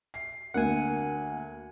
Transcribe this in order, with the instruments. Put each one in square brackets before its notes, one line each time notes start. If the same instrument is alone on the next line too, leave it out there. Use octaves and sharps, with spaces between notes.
[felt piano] C7
[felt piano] D2 A#3 [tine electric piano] F#5 G#5